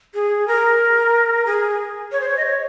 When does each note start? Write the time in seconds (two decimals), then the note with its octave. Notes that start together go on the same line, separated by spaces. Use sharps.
0.14 G#4
0.48 A#4
1.46 G#4
2.12 C#5
2.21 C5
2.29 C#5
2.37 D#5
2.46 C#5